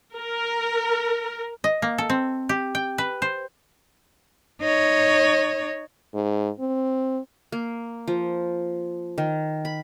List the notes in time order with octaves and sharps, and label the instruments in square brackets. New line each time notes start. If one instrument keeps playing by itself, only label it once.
[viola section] A#4
[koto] D#5
A#3
A4
C4
G4
G5
B4
C5
[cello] D#4 C#5
[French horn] G#2
C4
[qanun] A#3
F3
D#3
B5